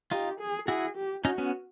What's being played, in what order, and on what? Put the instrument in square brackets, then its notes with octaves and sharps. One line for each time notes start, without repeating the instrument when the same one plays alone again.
[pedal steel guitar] D#4 F4 [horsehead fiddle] G4
[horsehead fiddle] G#4
[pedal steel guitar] E4 F#4 [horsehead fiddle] G#4
[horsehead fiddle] G4
[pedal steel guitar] C#4 D#4 [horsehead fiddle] F#4
[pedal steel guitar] B3 C#4